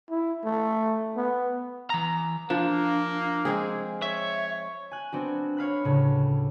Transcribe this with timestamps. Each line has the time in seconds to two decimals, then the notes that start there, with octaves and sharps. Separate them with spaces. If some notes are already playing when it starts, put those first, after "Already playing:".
0.10 E4
0.45 A3
1.17 B3
1.90 E3 A#5
2.50 F3 A#3 D4
3.45 G#3 C4 G#4
4.02 C#5 E5
4.92 G#5 F#6
5.12 B3 C4 D4 F#4
5.57 C#5 F5 B5 F#6
5.85 D2 A2 C#3